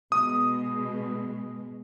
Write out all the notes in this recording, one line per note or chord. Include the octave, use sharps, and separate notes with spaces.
B2 G#3 D#6